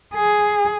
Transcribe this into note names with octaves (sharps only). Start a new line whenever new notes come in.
G#4